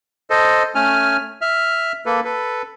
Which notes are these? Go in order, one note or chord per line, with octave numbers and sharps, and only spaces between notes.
A4 C5 D#5
A3 C#4 G#5 F6
E5 F6
A#3 A4 B4
A4 B4